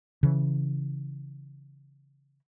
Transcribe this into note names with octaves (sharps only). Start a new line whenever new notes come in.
C#3 E3